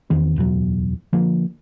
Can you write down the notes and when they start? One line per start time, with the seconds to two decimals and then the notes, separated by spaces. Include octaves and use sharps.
0.10 E2 D#3 C4
0.36 D1 E2 B2 F#3
1.13 D3 F3 A#3